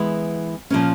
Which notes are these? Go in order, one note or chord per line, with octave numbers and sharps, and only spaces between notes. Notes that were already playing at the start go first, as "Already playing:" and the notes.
Already playing: E3 G#3 B3 E4
A#2 F3 A#3 C#4